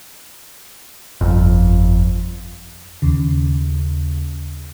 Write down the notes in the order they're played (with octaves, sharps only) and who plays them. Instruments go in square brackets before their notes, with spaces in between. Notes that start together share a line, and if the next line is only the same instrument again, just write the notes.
[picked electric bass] G1 F2
[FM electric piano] D#2 C#3